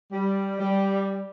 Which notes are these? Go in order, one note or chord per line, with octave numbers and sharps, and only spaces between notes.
G3
G3